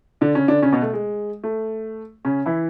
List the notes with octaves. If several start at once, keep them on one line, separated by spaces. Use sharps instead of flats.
D3 D4
C#3 C#4
D3 D4
C#3 C#4
B2 B3
A3
G#3
A3
C#3 C#4
E3 E4